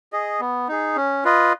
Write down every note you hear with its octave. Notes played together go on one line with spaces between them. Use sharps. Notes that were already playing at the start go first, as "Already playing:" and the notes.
G#4 D#5
B3
D#4 G#4
C#4
F4 B4 D#5